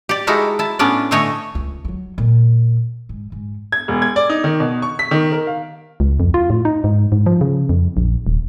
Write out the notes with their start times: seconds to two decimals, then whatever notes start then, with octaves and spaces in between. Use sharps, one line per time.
0.09 G4 D5
0.27 G#3 D#4 E4 F#4 A4 A#4
0.59 E4 A5
0.79 A2 B3 C#4 D4 D5
1.11 A2 D3 A3 C#5 D#5 G#5
1.55 C#2 A3
1.85 E3 F#3
2.18 A#2
3.09 G#2
3.32 G#2
3.72 G#6
3.88 E1
4.02 G#6
4.16 D5
4.30 D#4
4.44 D#3
4.60 B2
4.82 C#6
4.99 B6
5.11 D#3
5.32 A#4
5.47 F5
6.00 C#2
6.20 F2
6.34 F4
6.50 A2
6.65 D#4
6.84 G#2
7.12 G#2
7.26 F3
7.41 C#3
7.69 F2
7.97 A#1
8.27 D#1